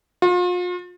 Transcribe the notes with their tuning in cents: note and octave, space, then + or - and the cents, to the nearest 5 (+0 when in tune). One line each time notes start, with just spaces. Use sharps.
F4 +40